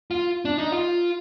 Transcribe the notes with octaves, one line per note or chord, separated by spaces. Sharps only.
F4
D4
D#4
F4